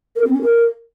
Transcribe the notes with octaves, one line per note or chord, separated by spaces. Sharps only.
A#4
C4
C#4
A#4